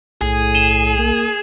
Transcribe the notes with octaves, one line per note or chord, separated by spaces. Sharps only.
B1 A2 G#4
D#7 E7 G7
A#3